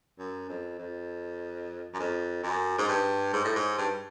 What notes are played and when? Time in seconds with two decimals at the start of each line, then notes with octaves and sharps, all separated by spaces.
0.19 F#2
0.49 F2
0.79 F2
1.94 F#2
1.99 F2
2.43 F#2
2.78 G#2
2.88 G2
3.33 G#2
3.45 A2
3.56 G#2
3.78 G2